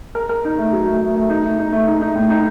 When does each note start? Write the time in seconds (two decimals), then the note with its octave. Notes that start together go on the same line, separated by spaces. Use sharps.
0.15 A#4
0.29 A#4
0.45 D#4
0.58 A3
0.73 F#3
0.87 A3
1.01 A3
1.16 A3
1.30 D#4
1.45 A3
1.59 D#4
1.72 A3
1.88 D#4
2.01 D#4
2.16 A2
2.30 D#4